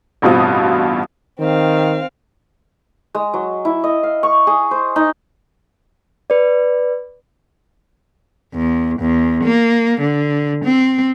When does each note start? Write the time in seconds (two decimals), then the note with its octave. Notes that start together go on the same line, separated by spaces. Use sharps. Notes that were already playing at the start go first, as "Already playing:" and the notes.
0.22 A1 G2 B2 C4 F4 D#6
1.39 D#3 C4 F5
3.15 G#3
3.34 F#3
3.65 E4
3.84 D#5
4.03 F5
4.23 C#6
4.47 G#4
4.71 C5
4.96 D#4
6.30 B4 D5
8.54 E2
8.99 E2
9.43 A#3
10.00 D3
10.64 C4